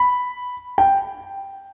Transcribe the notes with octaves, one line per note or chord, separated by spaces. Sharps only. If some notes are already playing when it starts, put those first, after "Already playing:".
Already playing: B5
G5